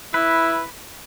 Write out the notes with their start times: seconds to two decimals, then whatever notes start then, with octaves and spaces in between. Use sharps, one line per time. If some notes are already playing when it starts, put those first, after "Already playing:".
0.14 E4 B4